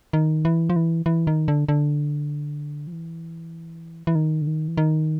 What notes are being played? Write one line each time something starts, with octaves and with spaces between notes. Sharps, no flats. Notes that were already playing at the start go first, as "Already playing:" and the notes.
D#3
E3
F3
E3
E3
D#3
D3
D3
F3
E3
E3
D#3
D3
D#3
E3
D#3